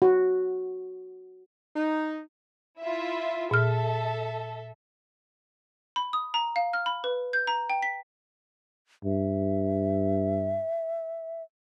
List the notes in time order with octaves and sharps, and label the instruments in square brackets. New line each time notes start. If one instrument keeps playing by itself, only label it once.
[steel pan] F#4
[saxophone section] D#4
[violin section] E4 F4 E5
[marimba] A#2 F6 [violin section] A4 E5
[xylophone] B5
D#6
A#5
F5
F6
B5
B4
G6
A#5
G5
B6
[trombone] G2 [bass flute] E5